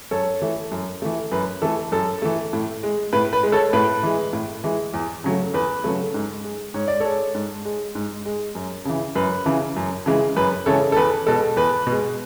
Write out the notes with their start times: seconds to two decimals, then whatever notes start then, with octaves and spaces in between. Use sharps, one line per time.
0.11 F#2 A4 C#5
0.42 E3 A3
0.72 F#2
1.02 E3 A3
1.32 F#2 B4
1.62 E3 A3 A4
1.92 F#2 A4
2.22 E3 A3
2.53 A2
2.83 G#3
3.13 A2 B4
3.33 B4
3.43 G#3
3.52 A4 C#5
3.73 A2 B4
4.03 E3 G#3
4.33 A2
4.64 E3 G#3
4.94 E2
5.24 C#3 F#3 A3
5.54 E2 B4
5.84 C#3 F#3 A3
6.14 G#2
6.44 G#3
6.74 G#2 C#5
6.88 D5
7.00 G#3 A4 C#5
7.35 G#2
7.65 G#3
7.95 G#2
8.26 G#3
8.55 F#2
8.85 C#3 E3
9.15 F#2 B4
9.46 C#3 E3
9.76 F#2
10.06 C#3 E3 G#3
10.37 F#2 B4
10.66 C#3 E3 G#3 A4 C#5
10.92 A4
10.97 E2 B4
11.27 B2 G#3 A4
11.56 E2 B4
11.87 B2 G#3